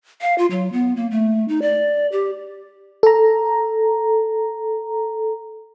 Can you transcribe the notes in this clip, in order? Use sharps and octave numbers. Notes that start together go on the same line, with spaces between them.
F5
F4
F#3
B3
A#3
A3
D#4
D5
G4
A4 A#5